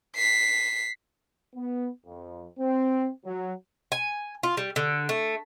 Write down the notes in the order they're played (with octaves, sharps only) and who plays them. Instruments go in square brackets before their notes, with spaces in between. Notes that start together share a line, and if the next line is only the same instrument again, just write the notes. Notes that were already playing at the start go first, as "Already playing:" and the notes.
[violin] B6 C7
[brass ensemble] B3
F2
C4
F#3
[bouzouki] G#5
F4
G3
D3
A3